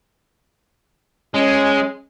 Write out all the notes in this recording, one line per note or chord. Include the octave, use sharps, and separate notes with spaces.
G#3 C#4